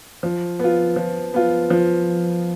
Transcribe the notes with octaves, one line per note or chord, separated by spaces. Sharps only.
F3
B3 F4
F3
B3 F4
F3